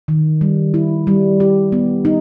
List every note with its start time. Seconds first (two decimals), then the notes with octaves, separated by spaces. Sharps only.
0.08 D#3
0.41 G3
0.74 E4
1.07 G3
1.40 G4
1.72 B3
2.05 D#4